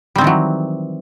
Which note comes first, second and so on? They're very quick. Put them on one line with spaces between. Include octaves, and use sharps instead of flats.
G3 C4 D#3 E3 F#3